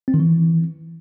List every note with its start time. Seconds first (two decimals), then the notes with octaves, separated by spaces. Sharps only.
0.08 C4
0.14 D#3
0.20 E3